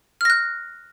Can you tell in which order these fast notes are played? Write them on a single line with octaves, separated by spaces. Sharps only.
F6 A#6 F#6